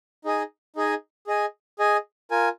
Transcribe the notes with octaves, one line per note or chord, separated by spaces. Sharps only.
D#4 G#4 D#5 G#5
D#4 G#4 D#5 G#5
G#4 D#5 G#5
G#4 D#5 G#5
F4 A#4 G#5